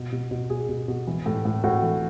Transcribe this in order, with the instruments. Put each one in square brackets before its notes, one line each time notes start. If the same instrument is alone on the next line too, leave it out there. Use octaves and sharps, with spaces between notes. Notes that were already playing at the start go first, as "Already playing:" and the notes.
Already playing: [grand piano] B2
B2
B2
B2 G#4
B2
B2
E3
A2
A2
A2 F#4
E3